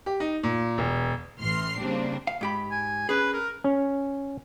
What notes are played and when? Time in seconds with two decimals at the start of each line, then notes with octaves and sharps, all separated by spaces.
0.06 G4
0.20 D#4
0.43 A#2
0.78 E1
1.39 A1 A2 E3 C6 F6 C7
1.77 C#3 G3 A#3 C4 D4
2.27 F5
2.41 G#2 G4 B5
2.71 G#5
3.09 C#4 G#4 B4
3.33 A#4
3.64 C#4